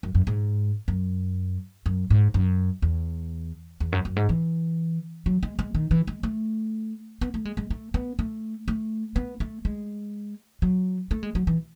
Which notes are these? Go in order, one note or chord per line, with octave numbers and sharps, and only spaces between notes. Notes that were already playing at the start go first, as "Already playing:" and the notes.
F#2
F#2
G#2
F#2
F#2
G#2
F#2
E2
E2
F#2
F#2
G#2
E3
F#3
G#3
G#3
D#3
E3
G#3
A3
B3
A3
G#3
G#3
A3
B3
A3
A3
B3
A3
G#3
F#3
A3
G#3
F#3
E3